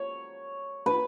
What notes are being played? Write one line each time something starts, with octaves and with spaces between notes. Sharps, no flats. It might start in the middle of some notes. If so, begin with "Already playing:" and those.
Already playing: C#5
B4